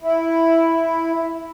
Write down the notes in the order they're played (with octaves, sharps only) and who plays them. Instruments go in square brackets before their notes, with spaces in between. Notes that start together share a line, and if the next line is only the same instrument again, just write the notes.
[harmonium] E4